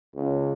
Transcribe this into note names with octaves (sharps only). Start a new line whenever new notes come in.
C#2